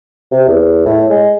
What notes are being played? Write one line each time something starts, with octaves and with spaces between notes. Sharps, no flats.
C3
E2
A2
G#3